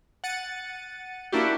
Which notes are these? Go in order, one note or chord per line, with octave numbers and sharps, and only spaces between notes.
F#5 A6 C#7 D#7
A#3 D4 E4 F#4 G4